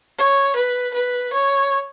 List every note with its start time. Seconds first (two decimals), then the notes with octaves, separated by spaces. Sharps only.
0.18 C#5
0.56 B4
0.94 B4
1.33 C#5